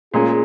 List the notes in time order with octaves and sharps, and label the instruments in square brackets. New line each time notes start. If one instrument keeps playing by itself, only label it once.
[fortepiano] A#2 G#3 C#4 [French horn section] F4 G#4